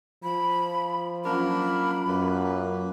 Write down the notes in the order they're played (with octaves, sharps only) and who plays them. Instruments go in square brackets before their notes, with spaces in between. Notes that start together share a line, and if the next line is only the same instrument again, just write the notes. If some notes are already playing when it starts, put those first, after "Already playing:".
[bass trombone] F3 [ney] B5
[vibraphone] F#3 C#4 F4 [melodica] A#3 D4 A#4 [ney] B5
[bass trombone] F#2 [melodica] A#3 B4